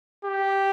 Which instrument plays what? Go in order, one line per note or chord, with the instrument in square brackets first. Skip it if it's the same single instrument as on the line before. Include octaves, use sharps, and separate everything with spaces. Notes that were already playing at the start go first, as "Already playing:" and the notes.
[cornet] G4